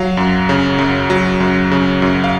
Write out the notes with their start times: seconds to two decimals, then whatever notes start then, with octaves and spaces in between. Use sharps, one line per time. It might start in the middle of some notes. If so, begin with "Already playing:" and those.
Already playing: F#3 F5
0.17 F#2
0.49 C#3
0.79 F#2
1.10 F#3
1.40 F#2
1.71 C#3
2.02 F#2
2.24 F5